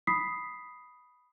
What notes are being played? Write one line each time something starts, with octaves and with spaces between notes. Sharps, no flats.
B5 D#6 B6 C7